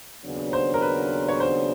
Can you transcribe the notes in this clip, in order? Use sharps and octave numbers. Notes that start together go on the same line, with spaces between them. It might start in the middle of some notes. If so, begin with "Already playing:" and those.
D#2 C#3 F#3 B3 D4
C5
A#4
B4
C#5
C5